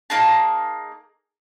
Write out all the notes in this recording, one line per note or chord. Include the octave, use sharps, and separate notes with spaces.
A#3 D#4 G#4 A5